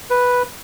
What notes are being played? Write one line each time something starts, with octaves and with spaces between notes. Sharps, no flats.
B4